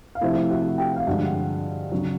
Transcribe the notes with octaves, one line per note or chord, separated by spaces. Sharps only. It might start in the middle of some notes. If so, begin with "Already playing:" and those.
F5
C3 F3 A3 E4 E5
F#4 F#5
G4 G5
F5
G2 D3 F3 G#3 F#4 F#5
C#3 F#3